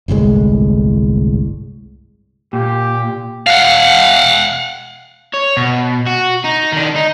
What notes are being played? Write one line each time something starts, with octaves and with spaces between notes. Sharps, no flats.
G1 C2 A2 G#3
A#2 G4
F5 F#5
C#5
B2
F#4
D#4
D#3 D4
D#4